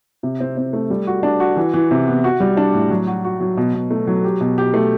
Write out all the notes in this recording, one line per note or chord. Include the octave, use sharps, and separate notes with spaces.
C3
C4
C4
A3
G3
F#4
D4
F#4
E3
E3
C3
B3
F#4
G3
D4
A2
F#3
F#4
F#4
F#3
B2
B2
A3
F#3
G4
B2
G4
A3